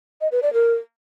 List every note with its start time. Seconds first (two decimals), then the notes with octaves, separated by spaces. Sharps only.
0.21 D#5
0.32 B4
0.43 D5
0.53 A#4